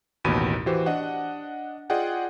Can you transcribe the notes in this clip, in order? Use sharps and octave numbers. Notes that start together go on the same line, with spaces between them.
A1 D#2 B2 B5 D#7
E3 F#4 G4 C5
D4 D#5 F#5
F4 G#4 D5 D#5 F#5 G5